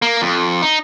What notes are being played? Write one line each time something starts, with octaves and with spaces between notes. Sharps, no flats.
A#3
F2
D#4